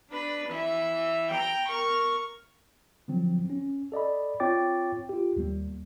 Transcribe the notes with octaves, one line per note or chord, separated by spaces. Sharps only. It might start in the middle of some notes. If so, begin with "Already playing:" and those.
D4 B4
E3 E5
G5 A#5
A#4 C#6
D3 F3 F#3 C4
C#4
A4 D5 D#5 B5
C4 F4 C#5 G5 D6 A6
F4 G4
D#2 G3 A#3